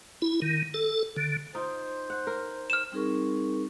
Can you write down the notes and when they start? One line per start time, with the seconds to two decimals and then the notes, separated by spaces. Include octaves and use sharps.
0.22 E4
0.42 D#3
0.74 A4
1.16 D3
1.55 D#4 F4 C5
2.10 F#5
2.27 A#4
2.70 F6 E7
2.92 G3 C4 D#4 G#4 A#4 C#6